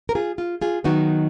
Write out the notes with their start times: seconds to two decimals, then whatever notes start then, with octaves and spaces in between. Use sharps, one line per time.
0.09 A#4
0.15 F4 G#4
0.38 F4
0.61 F4 G#4
0.84 D#3 F#3 B3 D#4 F#4